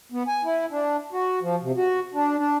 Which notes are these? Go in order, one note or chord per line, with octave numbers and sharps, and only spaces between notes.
B3
G#5
E4
D4
F#4
F3
C3
F#4
D4
D4